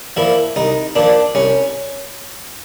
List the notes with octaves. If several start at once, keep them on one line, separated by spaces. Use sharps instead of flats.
A#2 F3 E4
C2 D#4
A#2 F3 D4
C2 C#4